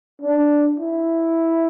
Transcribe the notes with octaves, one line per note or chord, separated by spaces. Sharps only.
D4
E4